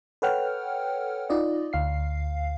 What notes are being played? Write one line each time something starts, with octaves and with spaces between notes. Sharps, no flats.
A4 B4 C#5 F#5 G5 F6
D#4 F4 D5 D#5
D2 F5 C7